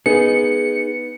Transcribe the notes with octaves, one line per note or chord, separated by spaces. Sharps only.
B3 D#4 G#4 C#7